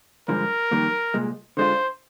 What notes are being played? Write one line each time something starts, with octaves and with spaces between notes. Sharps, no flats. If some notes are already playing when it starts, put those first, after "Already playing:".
G2 D3 F3 G#3 A#4
F2 D#3 G3 A#3
C2 A#2 G#3
D3 G#3 D4 F4 C5